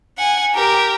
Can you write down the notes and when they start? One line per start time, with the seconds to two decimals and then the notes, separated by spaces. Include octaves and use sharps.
0.18 F#5 G#5
0.54 G4 A#4